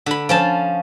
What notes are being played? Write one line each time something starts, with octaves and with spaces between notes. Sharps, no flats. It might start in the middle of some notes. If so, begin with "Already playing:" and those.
D3 B5
F3 C#4 A5